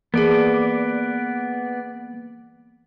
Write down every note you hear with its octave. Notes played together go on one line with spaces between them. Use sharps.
E3 A#3 B3 G#4 D5